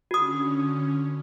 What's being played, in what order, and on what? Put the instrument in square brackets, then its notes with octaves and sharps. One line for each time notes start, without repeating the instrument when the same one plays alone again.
[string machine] D3 C#4 [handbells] F#4 D#6